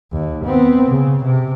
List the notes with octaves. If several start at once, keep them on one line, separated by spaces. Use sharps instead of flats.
D#2
B3 C4
C#3
C3